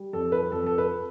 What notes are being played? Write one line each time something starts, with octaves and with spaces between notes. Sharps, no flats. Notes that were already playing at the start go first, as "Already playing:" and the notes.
Already playing: G3
F2 A4
B4
F2 A4
A4
B4